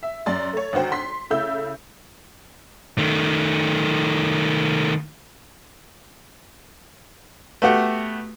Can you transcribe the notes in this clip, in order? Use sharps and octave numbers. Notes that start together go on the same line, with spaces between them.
E5
F#2 D5 C6 A6
A3 C#5
G#1 D2 F#4 C5 G5
C6 B6
C#3 A3 E4 E5 E6 G6
D#3 A3
A3 B3 F#4 G4 F#5